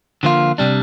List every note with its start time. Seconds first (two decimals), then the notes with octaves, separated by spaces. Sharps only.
0.23 D3 F3 A#3 F4
0.58 C3 G3 D4